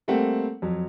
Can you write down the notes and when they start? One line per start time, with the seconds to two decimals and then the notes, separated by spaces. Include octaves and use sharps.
0.08 G3 A3 A#3 C4 F#5
0.62 F2 F#3